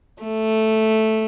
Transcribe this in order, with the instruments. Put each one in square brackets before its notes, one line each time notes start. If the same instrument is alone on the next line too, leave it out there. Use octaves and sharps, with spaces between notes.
[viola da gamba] A3